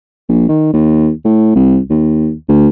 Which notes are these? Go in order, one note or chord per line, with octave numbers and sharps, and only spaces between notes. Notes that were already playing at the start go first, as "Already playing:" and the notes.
A#1
D#3
D#2
A2
C2
D#2
D2